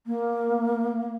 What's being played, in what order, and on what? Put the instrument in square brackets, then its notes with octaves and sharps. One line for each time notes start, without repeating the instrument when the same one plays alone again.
[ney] A#3